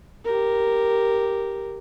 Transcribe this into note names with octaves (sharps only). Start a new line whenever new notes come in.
G4 A#4